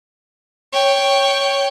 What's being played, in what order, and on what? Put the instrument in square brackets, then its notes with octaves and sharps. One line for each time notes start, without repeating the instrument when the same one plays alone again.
[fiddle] C#5 G5